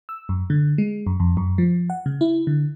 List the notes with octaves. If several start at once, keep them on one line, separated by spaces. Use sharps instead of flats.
E6
F#2
D3
G#3
F#2
F2
F#2
F3
F#5
C#3
E4
D3